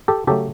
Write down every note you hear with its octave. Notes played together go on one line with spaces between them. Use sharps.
G4 A4
C#3 F#3 A3 G4 A4